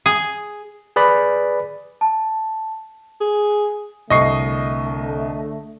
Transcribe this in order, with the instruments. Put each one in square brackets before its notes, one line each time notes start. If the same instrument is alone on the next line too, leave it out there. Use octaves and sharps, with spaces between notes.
[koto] G#4
[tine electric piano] G#4 B4 D5 B5
[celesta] A5
[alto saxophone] G#4
[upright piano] C2 [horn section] D3 A3 [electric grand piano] D#5 C#6 C7